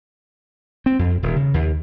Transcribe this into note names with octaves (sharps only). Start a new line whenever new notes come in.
C4
F2
D#1
C#3
D#2